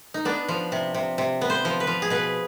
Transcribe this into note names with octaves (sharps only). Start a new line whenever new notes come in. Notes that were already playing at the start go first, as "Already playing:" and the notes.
D#4
B3 D4
F3
C3
C3
C3
B3
C5
F3
B4
F3
G#4
B2 B4